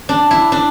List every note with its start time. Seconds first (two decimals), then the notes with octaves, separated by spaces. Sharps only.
0.09 D4
0.31 E4
0.52 D4